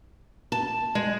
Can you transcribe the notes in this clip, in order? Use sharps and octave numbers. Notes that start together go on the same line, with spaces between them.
A5
G#3